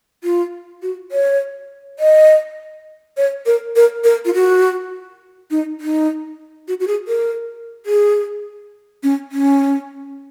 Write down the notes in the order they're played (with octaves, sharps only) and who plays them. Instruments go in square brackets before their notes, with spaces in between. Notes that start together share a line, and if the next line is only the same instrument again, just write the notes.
[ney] F4
F#4
C#5
D#5
C#5
A#4
A#4
A#4
F4
F#4
D#4
D#4
F#4
F#4
G#4
A#4
G#4
C#4
C#4